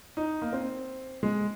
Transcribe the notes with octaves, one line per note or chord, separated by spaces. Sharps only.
D#4
A#3
C4
G#3